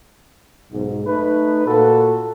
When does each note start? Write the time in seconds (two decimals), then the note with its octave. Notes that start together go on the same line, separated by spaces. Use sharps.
0.72 B1 G#2
1.06 A3 D#4 B4
1.66 A#2 F#4 A4